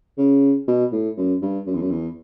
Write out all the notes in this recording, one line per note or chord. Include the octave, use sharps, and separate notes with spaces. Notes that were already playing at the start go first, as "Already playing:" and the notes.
C#3
B2
A2
F#2
G2
F#2
E2
F#2
E2